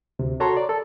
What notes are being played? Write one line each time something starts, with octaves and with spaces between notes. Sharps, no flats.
D2 C3
F#4 A4 C#5 A5 A#5 C6
D5
A4